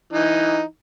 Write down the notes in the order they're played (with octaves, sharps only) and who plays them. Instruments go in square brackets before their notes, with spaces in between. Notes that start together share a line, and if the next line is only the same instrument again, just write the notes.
[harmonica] E3 D#4